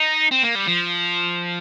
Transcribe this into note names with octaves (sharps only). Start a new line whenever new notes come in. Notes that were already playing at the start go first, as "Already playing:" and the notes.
Already playing: D#4
C4
A#3
G3
F3